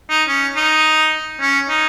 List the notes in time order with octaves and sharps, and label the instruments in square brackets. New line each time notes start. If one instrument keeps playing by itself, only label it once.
[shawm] D#4
C#4
D#4
C#4
D#4